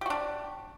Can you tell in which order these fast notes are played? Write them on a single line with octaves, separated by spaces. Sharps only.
G4 F#4 D4